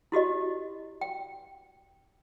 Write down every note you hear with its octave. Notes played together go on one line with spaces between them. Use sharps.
E4 F#4 G4 D#5
G5